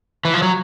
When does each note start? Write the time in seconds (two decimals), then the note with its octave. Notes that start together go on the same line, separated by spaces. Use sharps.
0.25 E3
0.34 F3
0.42 F#3